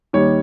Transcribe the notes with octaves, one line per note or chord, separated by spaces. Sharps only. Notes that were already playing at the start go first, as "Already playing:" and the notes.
D#2 D#3 G3 C#5